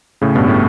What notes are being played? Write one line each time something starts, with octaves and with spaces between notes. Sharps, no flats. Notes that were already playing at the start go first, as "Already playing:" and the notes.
A2 C#3
G2 B2
A2